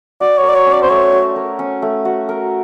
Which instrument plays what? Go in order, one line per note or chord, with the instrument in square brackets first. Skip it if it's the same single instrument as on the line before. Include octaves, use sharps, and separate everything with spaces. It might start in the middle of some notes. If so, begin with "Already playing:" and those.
[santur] F#4 [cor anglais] D5
[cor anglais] C#5
[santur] A#4
[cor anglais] D5
C#5
[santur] C#4
[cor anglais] D5
C5
[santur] A3 [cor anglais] C#5
[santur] F#4
A#4
C#4
A3
F#4
A#4